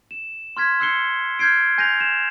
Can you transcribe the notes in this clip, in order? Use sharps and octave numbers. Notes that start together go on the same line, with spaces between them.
E7
C6 F6 G#6 B6
C6 E6 F#6 C7 C#7 G7
F6 G6 G#6 C7 D7
G#5 G6 A#6 C7 D#7 F7
E7